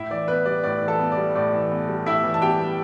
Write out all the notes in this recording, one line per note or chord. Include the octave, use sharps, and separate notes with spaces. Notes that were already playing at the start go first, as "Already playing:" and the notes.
Already playing: A2 E4 E5
E3 D5
B3 B4
G3 D5
A2 D5
E3
A4 A5
B3
D5
G3
A2 D5
E3
B3
G3
A2 E4 E5
E3
A5
B3 G4 G5
G3